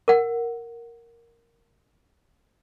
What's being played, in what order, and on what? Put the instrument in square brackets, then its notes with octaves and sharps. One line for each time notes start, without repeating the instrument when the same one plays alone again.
[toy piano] A#4 F#5